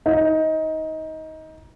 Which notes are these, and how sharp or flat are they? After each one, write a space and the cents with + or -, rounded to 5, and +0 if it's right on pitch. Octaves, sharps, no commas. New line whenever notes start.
D#4 +20